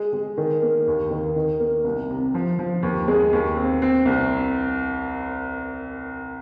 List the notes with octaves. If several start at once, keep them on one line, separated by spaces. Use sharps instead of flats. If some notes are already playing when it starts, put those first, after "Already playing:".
Already playing: G#3
G#3
D#3
A#3
D#2
D#3
D#3
A#3
C2
C3
F3
F3
D#2
G#3
D#2
C4
C4
C2